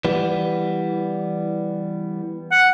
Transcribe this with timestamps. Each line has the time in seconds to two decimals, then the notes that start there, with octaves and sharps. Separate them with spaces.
0.05 E3 G3 B3
2.51 F#5